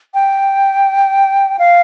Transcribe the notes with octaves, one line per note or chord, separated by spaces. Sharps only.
G5
F5